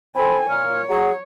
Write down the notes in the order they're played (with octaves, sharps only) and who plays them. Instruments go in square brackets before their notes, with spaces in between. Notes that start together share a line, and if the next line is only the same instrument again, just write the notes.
[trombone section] C4 [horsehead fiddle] A4 G#5 [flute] B5
[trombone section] A#2 [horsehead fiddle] C#5 [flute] F6
[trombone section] F#3 [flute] G#4